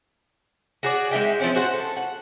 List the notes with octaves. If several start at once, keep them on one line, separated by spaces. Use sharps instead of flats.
F#4 G#4 D5
G#3 D#4 E5 G5
F3 C4 C#4
F#4 C5 F#5
A4
F#5